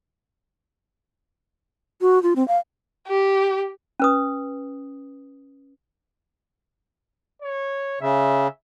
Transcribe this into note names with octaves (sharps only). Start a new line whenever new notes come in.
F#4
F4
C4
F5
G4
C#4 B4 D#6
C#5
C#3 E5